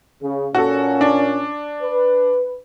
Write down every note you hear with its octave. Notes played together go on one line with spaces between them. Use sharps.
C#3
A#2 C#4 F#4 A4
D4
B4